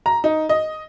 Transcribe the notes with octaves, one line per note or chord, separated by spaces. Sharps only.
A#5
D#4
D#5